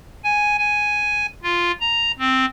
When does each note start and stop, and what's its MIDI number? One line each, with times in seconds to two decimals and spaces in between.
0.24 0.58 80
0.59 1.27 80
1.43 1.71 65
1.81 2.11 82
2.19 2.45 60